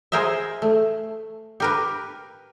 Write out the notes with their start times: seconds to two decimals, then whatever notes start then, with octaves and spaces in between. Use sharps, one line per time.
0.12 G#4 A#4 C5 D#5 E5
0.62 A3
1.60 G4 A#4 B4